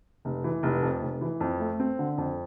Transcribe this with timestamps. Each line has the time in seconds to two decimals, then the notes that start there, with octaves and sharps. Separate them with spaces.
0.25 F1
0.44 E3
0.63 F1
0.82 F2
1.02 F1
1.21 E3
1.40 F2
1.60 A3
1.80 C4
1.99 D3
2.18 F2